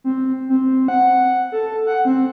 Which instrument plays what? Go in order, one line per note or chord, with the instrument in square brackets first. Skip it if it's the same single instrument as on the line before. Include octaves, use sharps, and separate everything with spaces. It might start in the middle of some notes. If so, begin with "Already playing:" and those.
[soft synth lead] C4
C4
F#5
A4
F#5
C4